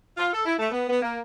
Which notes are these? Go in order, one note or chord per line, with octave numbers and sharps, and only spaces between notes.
F4
A4
E4
A3
B3
B3
A#3